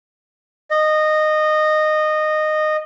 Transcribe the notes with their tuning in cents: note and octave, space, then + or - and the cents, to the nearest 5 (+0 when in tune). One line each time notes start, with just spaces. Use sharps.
D#5 -15